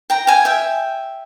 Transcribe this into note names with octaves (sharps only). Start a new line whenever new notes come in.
G5 A#5
F5 G#5
E5 G5